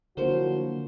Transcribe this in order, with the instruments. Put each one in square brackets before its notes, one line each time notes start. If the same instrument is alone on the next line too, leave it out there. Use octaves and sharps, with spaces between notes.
[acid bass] D3 [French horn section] F3 F#3 F#4 [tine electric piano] A#3 E4 A#4 [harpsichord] C5